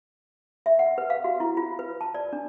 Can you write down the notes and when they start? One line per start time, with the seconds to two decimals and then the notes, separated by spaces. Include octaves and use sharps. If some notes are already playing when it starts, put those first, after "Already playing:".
0.66 E5
0.79 F#5
0.98 B4
1.10 F5
1.24 F#4
1.40 E4
1.57 F4
1.79 B4
2.01 A5
2.14 D5
2.33 D4